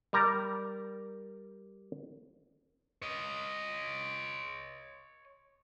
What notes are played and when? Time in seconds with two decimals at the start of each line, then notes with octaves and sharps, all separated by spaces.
0.13 G3 A#4 A#5
3.02 C#5 D#5